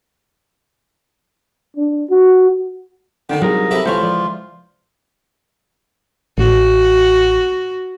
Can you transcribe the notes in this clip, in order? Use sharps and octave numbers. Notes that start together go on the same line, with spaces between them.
D4
F#4
D3 D#3 C#4 D#4 G5
C2 F#3 G#4 A#4 D#5
C3 G4 A4 E5 B5
C#2 E3 F4 A4 C5 C#5 G6
F3 D5
A1 F#4